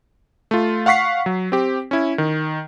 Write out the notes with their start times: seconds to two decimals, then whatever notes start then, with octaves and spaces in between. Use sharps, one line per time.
0.51 A3 F4
0.86 F5 F#5 C#6 B6 C7
1.26 F#3
1.52 C4 G4
1.91 C#4 E4
2.18 D#3